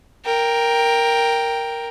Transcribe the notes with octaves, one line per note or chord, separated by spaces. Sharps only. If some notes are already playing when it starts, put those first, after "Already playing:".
A#4 G5